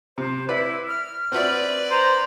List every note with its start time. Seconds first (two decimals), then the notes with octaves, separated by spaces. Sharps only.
0.18 C3 C5
0.49 E4 B4 D5
0.88 F6
1.32 C4 F#4 B4 D5 E5
1.91 C5 A#5